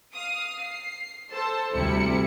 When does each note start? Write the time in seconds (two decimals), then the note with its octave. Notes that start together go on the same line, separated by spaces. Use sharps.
0.14 F5 D#6
0.61 C7
1.31 A4 C5 A5
1.73 D2 C3 G3 E4 C#7